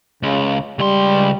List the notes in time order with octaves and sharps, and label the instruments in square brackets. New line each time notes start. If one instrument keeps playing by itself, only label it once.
[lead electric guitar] C#2 [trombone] C#3
[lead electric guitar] C#2 C6 [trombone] G3